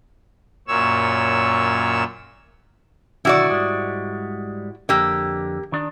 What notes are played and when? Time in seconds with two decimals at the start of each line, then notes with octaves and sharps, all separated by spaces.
0.68 F#2 A#2 C#5 E6
3.25 B1 D3 D#3 E4 F#4 D5
3.51 G#2 G3 G#3
4.89 F2 G#2 D3 A#3 G4
5.72 D#3 D4